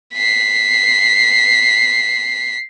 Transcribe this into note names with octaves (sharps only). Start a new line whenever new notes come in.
B6 C7